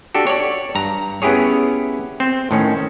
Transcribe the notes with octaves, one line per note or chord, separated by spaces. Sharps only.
D4 F#4 G4 A4
C#5 D5
G2 A#5
B3 C#4 E4 G4 G#4 C#5
C4
A2 D#3 C#4